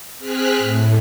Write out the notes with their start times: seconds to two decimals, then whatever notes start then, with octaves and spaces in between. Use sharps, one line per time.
0.18 C4 G#4 F6 F#6 B6
0.58 A2